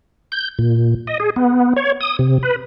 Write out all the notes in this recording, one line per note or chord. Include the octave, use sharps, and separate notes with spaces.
G6
A#2
D#5
G#4
B3
C#5
D#6
C3
B4